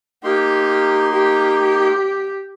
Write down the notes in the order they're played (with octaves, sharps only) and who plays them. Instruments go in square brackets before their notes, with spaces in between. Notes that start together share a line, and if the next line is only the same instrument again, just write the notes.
[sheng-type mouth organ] A#3 D#4 C6 [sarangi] G4
[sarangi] G4